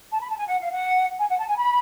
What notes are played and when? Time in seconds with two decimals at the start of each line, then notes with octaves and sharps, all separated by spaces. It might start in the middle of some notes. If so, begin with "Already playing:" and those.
0.11 A5
0.21 B5
0.30 A5
0.38 G#5
0.48 F#5
0.60 F5
0.71 F#5
1.20 G#5
1.29 F#5
1.39 A5
1.48 G#5
1.57 B5